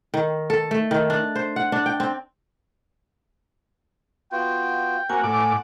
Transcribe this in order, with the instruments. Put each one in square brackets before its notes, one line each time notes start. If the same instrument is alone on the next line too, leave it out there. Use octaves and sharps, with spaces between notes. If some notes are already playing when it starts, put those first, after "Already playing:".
[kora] D#3
A4
A3
D#3
D4
C5
F#5
D4
G5
C4
[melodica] B3 F4 F#4 [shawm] G5
[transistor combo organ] A#3 F#4 [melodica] C4 [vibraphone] G#5
[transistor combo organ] A2 D6 [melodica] F#5